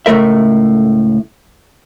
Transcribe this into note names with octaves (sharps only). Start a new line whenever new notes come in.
C#2 A2 F#3 A3 A#4 E5